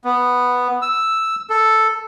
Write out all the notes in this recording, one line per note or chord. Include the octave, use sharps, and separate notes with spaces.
B3
E6
A4